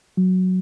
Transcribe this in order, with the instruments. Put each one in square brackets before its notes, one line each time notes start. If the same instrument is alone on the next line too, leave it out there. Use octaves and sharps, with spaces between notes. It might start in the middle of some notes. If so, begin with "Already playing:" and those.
[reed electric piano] F#3